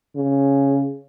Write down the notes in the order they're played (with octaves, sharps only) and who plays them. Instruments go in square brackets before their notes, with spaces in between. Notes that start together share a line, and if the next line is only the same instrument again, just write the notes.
[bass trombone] C#3